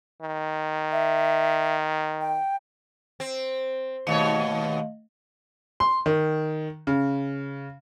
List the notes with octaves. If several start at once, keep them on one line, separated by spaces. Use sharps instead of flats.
D#3
E5
G5
C4
D#2 B2 A3 C#5 D#5 F5
C6
D#3
C#3